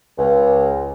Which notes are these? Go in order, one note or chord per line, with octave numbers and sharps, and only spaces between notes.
C#2